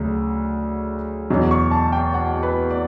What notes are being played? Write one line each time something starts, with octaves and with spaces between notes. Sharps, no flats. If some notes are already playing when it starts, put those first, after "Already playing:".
Already playing: D2 C#3 F#3
E2 B2 F#3
C#6
A5
G5
F#5
B4
D5